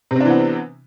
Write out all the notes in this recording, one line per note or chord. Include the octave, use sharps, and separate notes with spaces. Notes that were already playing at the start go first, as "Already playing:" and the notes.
C3 E3 B3 C4 D4